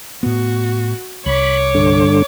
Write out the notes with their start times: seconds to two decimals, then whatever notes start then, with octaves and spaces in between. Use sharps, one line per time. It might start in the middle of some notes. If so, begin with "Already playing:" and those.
0.23 A2 B3 F#4
1.26 C2 C#5 B5 D6
1.75 G2 D3